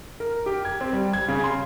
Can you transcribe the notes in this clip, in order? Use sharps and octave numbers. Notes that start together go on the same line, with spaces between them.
A#4
G4
G#6
C4
G3
G#6
C#3
C6